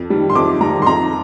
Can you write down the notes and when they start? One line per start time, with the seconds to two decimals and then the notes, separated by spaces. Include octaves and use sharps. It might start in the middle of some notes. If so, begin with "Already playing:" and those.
Already playing: F2
0.10 D#3 G3
0.29 C6
0.35 F2 D6
0.61 D#3 G3 A#5
0.82 C6
0.86 F2 A#5